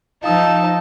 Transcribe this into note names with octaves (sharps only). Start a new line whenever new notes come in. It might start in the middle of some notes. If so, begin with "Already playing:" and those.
F3 D#4 F5 A5 D#6 E6